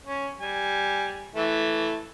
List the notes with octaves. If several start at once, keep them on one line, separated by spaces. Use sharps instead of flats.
C#4
G3 G#5
E3 A3